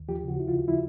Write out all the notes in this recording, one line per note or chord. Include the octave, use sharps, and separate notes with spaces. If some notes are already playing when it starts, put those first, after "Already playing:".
Already playing: D#2
F3 G4
C#3 F#4
C#2 E4
F4
C#2
F3 E4